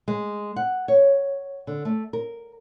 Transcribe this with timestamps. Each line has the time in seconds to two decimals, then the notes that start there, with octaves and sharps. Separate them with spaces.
0.08 G#3
0.56 F#5
0.88 C#5
1.67 D3
1.85 A3
2.13 A#4